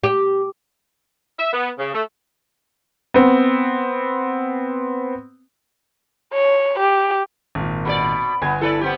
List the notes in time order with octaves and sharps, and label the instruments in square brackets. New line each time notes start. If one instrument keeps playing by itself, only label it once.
[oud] G4
[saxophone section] E5
B3
C#3
A3
[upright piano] B3 C4
[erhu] C#5
G4
[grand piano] G#1 A#2
[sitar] B2 A#4 D5 [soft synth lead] B5
[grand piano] G1 G#5 G#6 [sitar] B3
[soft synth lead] E4 [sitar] A4 B4 D5
[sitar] B3 C4 G4